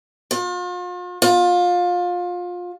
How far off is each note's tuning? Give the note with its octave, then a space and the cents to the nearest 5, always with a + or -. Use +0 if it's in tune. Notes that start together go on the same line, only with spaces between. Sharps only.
F4 +40
F4 +25